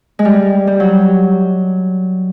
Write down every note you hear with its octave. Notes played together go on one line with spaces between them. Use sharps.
G#3
G3
G3
F#3